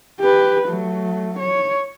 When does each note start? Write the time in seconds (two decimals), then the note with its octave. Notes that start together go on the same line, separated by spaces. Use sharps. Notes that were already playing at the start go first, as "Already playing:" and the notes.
0.20 G4 B4
0.68 F#3 A3
1.39 C#5